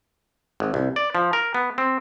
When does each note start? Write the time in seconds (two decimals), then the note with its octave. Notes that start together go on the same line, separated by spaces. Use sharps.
0.60 G#1
0.74 C2
0.96 D5
1.15 F3
1.33 A#4
1.55 B3
1.78 C4